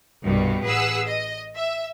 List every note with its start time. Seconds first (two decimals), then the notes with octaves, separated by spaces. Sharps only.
0.24 C2 G2 B2 G3
0.64 A1 G#4 B4 F#5 E6
1.07 D#5
1.55 E5